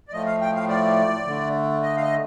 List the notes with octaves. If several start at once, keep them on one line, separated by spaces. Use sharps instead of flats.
D5
A2 F3 A3 D#5
F5
G5
F5
D5
D3 A3
D#5
F5
D#5